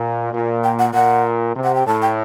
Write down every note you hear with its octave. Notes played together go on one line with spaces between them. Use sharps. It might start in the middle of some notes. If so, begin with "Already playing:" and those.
Already playing: A#2
A#2
G5
F#5
A#2 F#5
C3
F#5
G5
A2 A5
G5